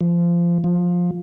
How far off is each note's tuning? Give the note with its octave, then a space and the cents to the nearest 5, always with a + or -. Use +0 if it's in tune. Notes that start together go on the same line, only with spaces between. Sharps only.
F3 -20
F3 +15